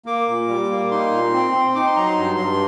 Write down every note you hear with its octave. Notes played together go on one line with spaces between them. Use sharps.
A#3 D6
A#2
G3
A#3
D#4 C6
A#2
C4
C4
D#4 D6
C6
F#3 A#5
C6
G2
G2